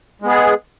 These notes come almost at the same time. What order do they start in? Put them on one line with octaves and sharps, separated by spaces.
G#3 B3 G#4